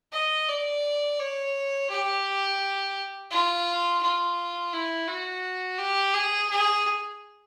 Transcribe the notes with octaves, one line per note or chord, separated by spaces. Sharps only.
D#5
D5
C#5
G4
F4
F4
E4
F#4
G4
G#4
G#4